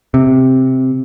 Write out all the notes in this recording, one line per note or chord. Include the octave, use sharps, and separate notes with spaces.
C3